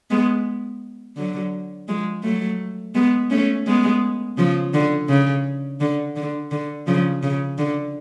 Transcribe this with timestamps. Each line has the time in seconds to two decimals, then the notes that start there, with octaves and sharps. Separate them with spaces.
0.11 G#3 B3
1.17 D3 F#3
1.88 F3 G#3
2.23 F#3 A3
2.95 G#3 B3
3.30 A3 C#4
3.67 G#3 B3
4.38 C#3 F3
4.74 D3
5.09 C#3
5.80 D3
6.16 D3
6.51 D3
6.87 C#3 F3
7.23 C#3
7.58 D3